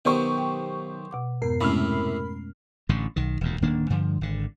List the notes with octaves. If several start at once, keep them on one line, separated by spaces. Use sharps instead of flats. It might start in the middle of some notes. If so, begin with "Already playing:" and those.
B1 D#3 B3 G4 C5 C#6
G5
B2 F#5 D6
F2 G#2 B3 A#4 C7
A2 C3 G#3 A3 C#4 B5 F6
A1 A2 D3
B1 D#3
E1 D2 A#2
D1 D#3 A#3 D4
G2 D3 F3
G#1 D3